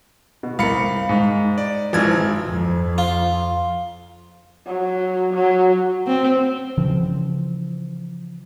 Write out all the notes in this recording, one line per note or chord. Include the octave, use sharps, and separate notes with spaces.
B2
C2 A#4 F5 B5 C#7
G#2
D5
G#1 E3 F3 G#6
F2
F4
F#3
F#3
C4
C#3 E3 F3